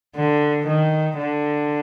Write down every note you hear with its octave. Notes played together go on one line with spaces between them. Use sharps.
D3
D#3
D3